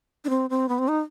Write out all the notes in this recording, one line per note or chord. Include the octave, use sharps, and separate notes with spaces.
D4
C4
C4
B3
C4
D#4